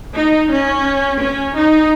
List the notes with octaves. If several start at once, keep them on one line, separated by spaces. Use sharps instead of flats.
D#4
C#4
C#4
D#4